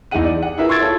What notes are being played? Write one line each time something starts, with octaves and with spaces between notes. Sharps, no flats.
E2 D#4 E4 G#4 F#5 D#7
D5
G#4 F#5
E4 F4 G#4 A#4 B4 E5
C6 C#6 E6 G#6 A6 D7
E4 F4 A4 C#5